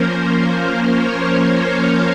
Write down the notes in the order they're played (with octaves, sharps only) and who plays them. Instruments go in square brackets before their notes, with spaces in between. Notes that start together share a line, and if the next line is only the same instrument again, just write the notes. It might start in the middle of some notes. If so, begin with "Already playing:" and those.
Already playing: [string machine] F3 A#3 C#4 A#4 C5
C5
C#5
F5